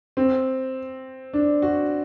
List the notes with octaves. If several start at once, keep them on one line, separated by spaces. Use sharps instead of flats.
C4
D4
F#4